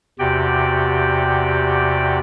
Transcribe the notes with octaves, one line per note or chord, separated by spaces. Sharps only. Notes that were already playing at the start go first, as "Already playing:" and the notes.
E2 C3 F#4 G4 D5 G5